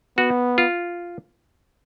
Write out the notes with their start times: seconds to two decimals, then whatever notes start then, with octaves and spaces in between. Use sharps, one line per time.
0.18 B3 F#4
0.58 F4